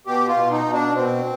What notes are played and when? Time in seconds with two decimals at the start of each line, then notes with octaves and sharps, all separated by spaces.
0.06 B2 G4
0.28 F4
0.36 B2
0.51 D#4
0.66 B2
0.73 D4
0.95 B2 C4